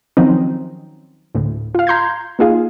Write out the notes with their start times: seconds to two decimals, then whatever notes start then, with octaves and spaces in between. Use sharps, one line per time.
0.17 D#3 F3 F#3 C4 C#4 D#4
1.35 D2 A2
1.75 F4 F5
1.87 A#5 C6 G6 G#6
2.39 A#3 D#4 F4 G#4 F5